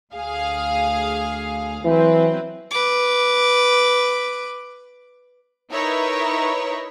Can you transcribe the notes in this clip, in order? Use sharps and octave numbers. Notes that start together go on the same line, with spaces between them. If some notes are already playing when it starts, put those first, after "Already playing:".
D2 G#4 F5
E3 F#3 C4 B4
B4 D6
D#4 E4 A#4 B4 C#5 E5